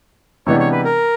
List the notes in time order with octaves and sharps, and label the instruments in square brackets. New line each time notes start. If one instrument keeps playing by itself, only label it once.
[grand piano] C3 E3 G#3 B3 D4 [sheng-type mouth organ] C#5
[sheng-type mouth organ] C#5
B4
A#4